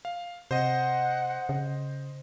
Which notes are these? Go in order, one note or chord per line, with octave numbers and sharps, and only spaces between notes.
F5
C3 C5 D#5 F#5
C#3